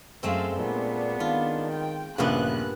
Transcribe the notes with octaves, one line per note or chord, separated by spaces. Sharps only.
F#2 G#3 A3 C4 F5
A#2 B3 D4
D#3 F4
G5
A#1 G2 A#2 C#3 B3 F#6